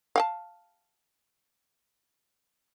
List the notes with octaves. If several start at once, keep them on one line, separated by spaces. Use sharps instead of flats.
F5 G5 A5